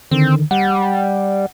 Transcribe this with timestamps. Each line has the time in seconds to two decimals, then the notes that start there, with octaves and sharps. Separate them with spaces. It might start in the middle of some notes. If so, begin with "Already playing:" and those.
0.11 D3 D#3 C4
0.51 G3 F#5